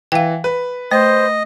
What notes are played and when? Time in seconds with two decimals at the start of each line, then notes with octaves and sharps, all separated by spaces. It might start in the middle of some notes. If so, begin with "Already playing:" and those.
0.12 E3 F5 G5
0.44 B4
0.92 A3 C5 D#5